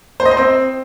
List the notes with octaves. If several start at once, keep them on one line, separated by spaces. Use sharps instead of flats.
C5
D#5
C5
C4